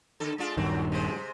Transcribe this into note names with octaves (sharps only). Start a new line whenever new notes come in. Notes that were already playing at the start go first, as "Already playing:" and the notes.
D#2 D3 A4
G#3 D4 F4
D#1 G2 D#3 F#3 C4
C3 G#3 C5